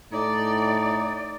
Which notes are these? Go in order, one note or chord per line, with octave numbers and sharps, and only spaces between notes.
A2 D#4 D5